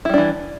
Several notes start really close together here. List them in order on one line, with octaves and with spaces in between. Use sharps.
E4 G3 D4 E3